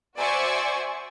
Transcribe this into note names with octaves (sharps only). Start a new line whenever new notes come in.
F#4 C5 D5 E5 G#5 C#6